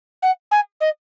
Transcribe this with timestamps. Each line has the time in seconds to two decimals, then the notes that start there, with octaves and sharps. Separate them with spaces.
0.22 F#5
0.51 G#5
0.80 D#5